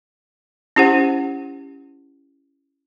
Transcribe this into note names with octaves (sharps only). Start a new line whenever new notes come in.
C#4 E4 G4 C5 F#5